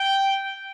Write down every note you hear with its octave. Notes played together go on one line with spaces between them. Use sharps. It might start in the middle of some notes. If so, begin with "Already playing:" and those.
Already playing: G5